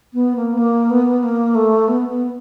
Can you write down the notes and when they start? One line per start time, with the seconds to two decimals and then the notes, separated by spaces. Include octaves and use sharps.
0.14 B3
0.36 A#3
0.53 B3
0.58 A#3
0.90 B3
1.23 A#3
1.55 A3
1.88 B3
2.10 B3